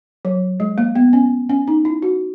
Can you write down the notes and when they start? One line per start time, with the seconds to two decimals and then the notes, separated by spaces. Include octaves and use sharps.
0.25 F#3
0.60 G#3
0.78 A#3
0.95 B3
1.13 C#4
1.49 C#4
1.68 D#4
1.85 E4
2.02 F#4